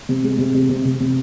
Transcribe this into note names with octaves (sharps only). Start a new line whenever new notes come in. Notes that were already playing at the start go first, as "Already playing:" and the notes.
C3
G#3
C3
C3
C3
C3
C3